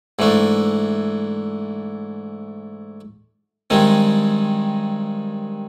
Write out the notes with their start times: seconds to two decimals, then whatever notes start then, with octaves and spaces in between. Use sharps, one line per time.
0.19 G#2 E3 A3 D4
3.70 G2 D#3 G#3 C4